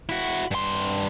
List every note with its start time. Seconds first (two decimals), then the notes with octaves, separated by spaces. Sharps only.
0.09 E4 F#4
0.51 G2 C6